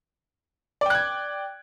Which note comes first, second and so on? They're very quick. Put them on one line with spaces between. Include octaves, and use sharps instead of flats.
D5 G5 F#6 G#6